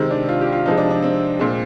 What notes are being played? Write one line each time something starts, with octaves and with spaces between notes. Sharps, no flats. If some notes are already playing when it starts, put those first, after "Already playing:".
Already playing: C3 D#3 G#3 C4
D4
F4
G4
F4
C3 F3 G#3 D#4
D4
D4
C4
A#2 G#3 C4